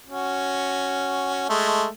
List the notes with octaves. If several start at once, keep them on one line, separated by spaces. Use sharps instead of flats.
C#4 F#4
G#3 A3